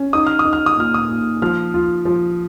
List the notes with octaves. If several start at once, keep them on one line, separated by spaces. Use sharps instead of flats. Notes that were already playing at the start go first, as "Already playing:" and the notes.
Already playing: C#4
D#4 D#6
F6
D#6
D#4
F6
D#6
A#2 F6
D#6
A#2
F3 F6
F4
F3